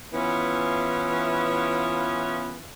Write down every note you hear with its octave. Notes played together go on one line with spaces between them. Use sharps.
E3 B3 C#4 E4 F4